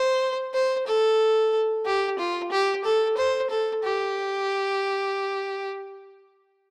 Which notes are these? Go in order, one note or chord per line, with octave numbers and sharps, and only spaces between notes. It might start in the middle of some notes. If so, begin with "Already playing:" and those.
Already playing: C5
C5
A4
G4
F4
G4
A4
C5
A4
G4